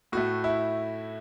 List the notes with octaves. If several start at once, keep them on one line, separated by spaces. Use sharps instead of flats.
A2 A3 F#4
E4